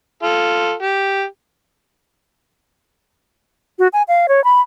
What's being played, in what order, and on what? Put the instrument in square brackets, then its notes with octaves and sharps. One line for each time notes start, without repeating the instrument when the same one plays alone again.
[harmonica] F4 A4
G4
[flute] F#4
G#5
F5
C#5
B5